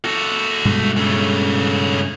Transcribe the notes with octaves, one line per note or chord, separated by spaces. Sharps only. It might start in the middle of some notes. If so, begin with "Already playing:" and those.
F#4 A4
G2 B2 G#3
C#3 A3